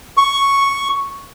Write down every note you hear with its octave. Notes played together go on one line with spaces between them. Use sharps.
C#6